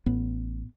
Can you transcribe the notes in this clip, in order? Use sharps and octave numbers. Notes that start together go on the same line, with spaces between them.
A1 A2 B3